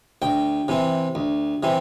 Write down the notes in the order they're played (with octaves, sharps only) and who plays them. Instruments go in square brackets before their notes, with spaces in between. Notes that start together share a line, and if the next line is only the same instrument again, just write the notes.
[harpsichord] D2 G5
C3 E3 C4
D2
C3 E3 C4